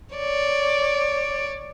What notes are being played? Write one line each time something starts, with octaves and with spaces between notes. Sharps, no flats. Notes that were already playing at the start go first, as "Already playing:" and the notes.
C#5 D5